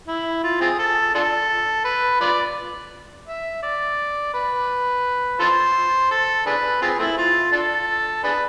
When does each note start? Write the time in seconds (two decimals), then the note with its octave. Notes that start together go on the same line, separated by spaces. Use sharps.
0.08 E4
0.43 F4
0.61 C4 F4 G#4
0.79 A4
1.15 D4 F4 A4
1.84 B4
2.21 F4 B4 D5
3.27 E5
3.63 D5
4.34 B4
5.40 F4 A4 C5
6.11 A4
6.46 D4 G#4 B4
6.82 C4 F4 G#4
6.99 A3 C4 E4
7.18 F4
7.52 D4 F4 A4
8.24 D4 G#4 B4